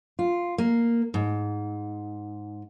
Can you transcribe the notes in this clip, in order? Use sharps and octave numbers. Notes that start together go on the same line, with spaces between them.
F4
A#3
G#2